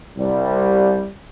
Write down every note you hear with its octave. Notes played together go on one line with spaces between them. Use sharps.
C2 G3